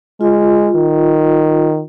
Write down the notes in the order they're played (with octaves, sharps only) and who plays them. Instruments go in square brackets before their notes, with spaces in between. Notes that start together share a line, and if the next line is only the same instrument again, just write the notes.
[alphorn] G#3 [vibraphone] F4
[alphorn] D#3